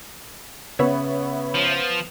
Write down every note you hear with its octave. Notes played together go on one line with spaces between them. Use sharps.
C#3 B3 C#5 E5 B5
F3